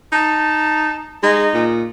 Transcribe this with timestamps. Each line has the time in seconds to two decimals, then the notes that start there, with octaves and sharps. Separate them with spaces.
0.12 D#4 A5
1.23 G#3 D#4
1.54 A#2